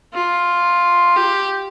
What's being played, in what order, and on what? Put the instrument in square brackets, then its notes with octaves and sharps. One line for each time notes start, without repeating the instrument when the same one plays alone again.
[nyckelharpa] F4
G4